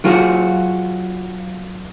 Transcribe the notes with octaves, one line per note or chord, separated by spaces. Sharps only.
F#3 F4 F#4 G#4